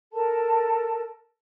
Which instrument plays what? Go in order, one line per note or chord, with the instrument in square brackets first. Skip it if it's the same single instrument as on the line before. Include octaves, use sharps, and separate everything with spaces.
[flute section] A4 A#4 A5